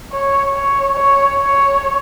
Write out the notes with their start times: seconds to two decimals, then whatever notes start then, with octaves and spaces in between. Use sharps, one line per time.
0.12 C#5
0.54 C#5
0.96 C#5
1.38 C#5